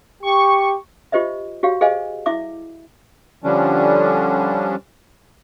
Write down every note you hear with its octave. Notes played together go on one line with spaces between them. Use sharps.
G4 C#6
F4 G4 C5 D#5 E5
F#4 G4 C#5 F5
G#4 C5 D#5 F5 G#5
E4 E5 D6
D3 F3 G3 C#4 D4